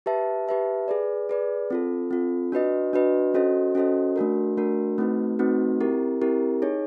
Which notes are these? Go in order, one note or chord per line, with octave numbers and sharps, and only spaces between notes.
G4 B4 E5 A5
G4 B4 E5 A5
G#4 B4 D5
G#4 B4 D5
C4 F4 A4
C4 F4 A4
D4 F#4 B4 D#5
D4 F#4 B4 D#5
C#4 F#4 A4 C5 D#5
C#4 F#4 A4 C5 D#5
A3 D4 F#4 A#4
A3 D4 F#4 A#4
A3 C4 D#4 F#4 B4
A3 C4 D#4 F#4 B4
C4 E4 G4 A#4
C4 E4 G4 A#4
D#4 G#4 C#5